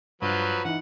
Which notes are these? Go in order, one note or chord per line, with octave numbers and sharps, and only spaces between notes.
G2 F3 F#3 B4
E3 D#4 F#5